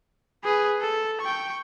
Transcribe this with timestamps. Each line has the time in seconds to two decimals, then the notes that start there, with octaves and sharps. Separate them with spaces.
0.44 G#4 B4
0.81 A4
1.21 G5 C#6